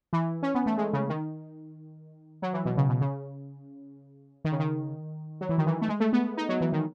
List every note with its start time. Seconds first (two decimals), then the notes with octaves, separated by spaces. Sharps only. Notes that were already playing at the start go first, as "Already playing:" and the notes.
0.13 E3
0.43 C#4
0.55 B3
0.66 A3
0.77 G#3
0.93 C#3
1.09 D#3
2.42 F#3
2.53 E3
2.65 B2
2.77 C#3
2.89 B2
3.01 C#3
4.45 D#3
4.52 C#3
4.60 D#3
5.41 F#3
5.49 E3
5.58 D#3
5.67 E3
5.82 A3
5.89 G#3
6.00 A3
6.13 B3
6.37 D#4
6.49 F#3
6.61 E3
6.72 D#3